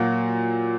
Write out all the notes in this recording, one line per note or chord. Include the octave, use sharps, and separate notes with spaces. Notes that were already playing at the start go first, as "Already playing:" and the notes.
Already playing: A#2 F#3 A#3 F#4